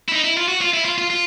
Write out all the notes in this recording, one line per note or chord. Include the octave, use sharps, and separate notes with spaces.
E4
D#4
E4
F4
F#4
F4
E4
F4
F4
F4